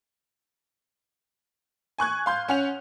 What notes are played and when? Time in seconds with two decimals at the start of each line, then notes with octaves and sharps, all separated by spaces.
1.98 G#5 C#6 F#6 G#6
2.26 F5 C6 G6
2.48 C#4 F#5 F7